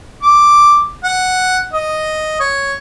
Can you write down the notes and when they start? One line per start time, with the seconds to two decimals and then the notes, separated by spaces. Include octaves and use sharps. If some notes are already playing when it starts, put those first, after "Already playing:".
0.23 D6
1.04 F#5
1.73 D#5
2.40 C#5